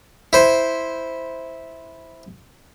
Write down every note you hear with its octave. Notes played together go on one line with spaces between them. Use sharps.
E4 C5